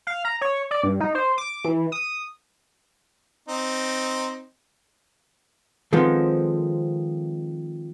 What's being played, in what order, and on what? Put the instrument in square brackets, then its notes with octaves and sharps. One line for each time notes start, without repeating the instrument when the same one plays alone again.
[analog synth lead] F5
A#5
C#5
D5
G2
D#4
C5
D6
E3
D#6
[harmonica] C4 D#4
[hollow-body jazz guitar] D#3 F3 G#3 B3 C4 A4